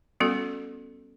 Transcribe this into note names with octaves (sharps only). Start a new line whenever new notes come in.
G3 B3 C#4 F#4 A4